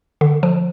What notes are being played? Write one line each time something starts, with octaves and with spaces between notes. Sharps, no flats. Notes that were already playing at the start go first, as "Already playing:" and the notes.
D3
F3